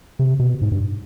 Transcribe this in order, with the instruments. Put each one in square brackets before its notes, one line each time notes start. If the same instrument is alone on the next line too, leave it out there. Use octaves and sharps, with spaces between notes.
[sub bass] C3
B2
G#2
G2